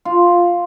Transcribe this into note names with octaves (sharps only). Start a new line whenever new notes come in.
F4